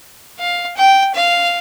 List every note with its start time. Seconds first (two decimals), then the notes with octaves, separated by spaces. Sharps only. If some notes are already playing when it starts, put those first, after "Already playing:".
0.39 F5
0.77 G5
1.14 F5